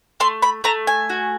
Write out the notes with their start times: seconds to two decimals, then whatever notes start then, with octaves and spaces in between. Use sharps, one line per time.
0.20 A3 C6
0.42 B5
0.64 A3 A#5
0.87 G#5
1.10 F#4